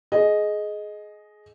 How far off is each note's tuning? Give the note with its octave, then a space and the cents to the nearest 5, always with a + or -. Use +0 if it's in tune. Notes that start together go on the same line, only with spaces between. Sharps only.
G#4 +20 D#5 +0